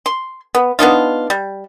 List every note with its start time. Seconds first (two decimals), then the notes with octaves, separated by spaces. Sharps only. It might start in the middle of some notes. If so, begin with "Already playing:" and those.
0.06 C6
0.55 B3
0.79 B3 D4 D#4 F4
1.30 G3